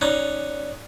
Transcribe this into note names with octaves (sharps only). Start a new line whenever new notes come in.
C#4 D#4 D5 F#6 G#6